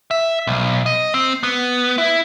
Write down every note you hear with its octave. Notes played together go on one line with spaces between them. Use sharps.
E5
B1
D#5
C4
B3
E4